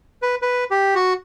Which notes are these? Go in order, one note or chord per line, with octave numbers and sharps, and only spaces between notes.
B4
B4
G4
F#4